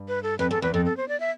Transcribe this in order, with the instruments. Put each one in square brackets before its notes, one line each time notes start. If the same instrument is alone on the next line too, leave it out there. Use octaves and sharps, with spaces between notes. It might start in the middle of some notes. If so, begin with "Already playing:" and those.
Already playing: [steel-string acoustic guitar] G2
[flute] B4
A4
[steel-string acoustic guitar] F2 [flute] B4
[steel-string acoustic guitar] E2 [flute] A4
[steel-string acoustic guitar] E2 [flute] B4
[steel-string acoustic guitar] F2 [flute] A4
[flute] A4
C5
D5
E5